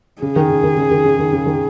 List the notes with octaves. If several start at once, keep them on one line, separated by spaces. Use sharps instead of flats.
C#3 G#4
D#3
C#3
D#3
C#3
D#3
C#3
D#3
C#3
D#3